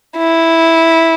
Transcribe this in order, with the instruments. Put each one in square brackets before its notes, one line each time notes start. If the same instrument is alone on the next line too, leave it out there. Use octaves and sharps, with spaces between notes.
[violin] E4